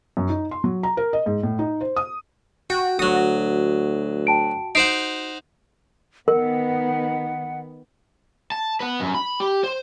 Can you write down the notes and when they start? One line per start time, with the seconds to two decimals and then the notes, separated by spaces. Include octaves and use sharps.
0.17 F#2
0.29 D#4
0.51 C6
0.64 F#3
0.83 A#5
0.97 A#4
1.13 D#5
1.26 G#2
1.43 A2
1.59 D#4
1.81 C5
1.96 D#6
2.70 F#4 G5
2.99 D2 F#3 F#4 D#6
4.27 G5 A5 D7
4.75 D#4 C5 F#5 C7 D7
6.28 D#3 B3 A#4 F#5
8.52 A5
8.80 B4 F#5
9.00 F#2
9.15 B5
9.40 G4
9.64 C5